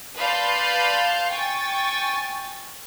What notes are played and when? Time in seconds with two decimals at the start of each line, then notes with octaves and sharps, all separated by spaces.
0.18 B4 D5 F5 A5 C6 G6
1.30 G5 G#5 C#6 A6